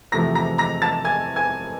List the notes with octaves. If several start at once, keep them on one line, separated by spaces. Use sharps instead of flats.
E2 C3 F3 A3 A#5 A#6
A#5 A#6
A#5 A#6
A5 A6
G#5 G#6
G#5 G#6